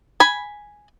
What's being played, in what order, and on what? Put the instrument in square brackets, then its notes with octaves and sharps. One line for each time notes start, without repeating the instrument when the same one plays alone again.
[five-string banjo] G#5 B5